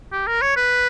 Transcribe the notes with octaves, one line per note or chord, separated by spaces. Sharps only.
G4
A#4
C#5
B4